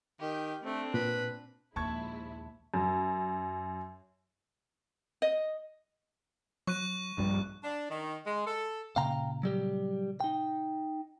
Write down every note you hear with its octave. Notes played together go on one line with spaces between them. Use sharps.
D#3 G4
A3 C4 D4
A#2 B4
A#1 D#2 G#3 E4 A5 C#6 G#6
F#2
D#5
F#3 C#6 F#6 D#7
A#1 G2 G3
D4
D#3
G#3
A4
A#2 C#3 F5 G5 A#5
F#3 G3 G4
D#4 G5